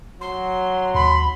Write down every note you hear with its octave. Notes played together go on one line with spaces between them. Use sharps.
F#3 C6
D#2 B5 C6